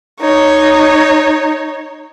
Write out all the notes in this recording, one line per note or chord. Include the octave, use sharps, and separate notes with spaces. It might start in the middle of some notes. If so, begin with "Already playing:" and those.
D#4 C#5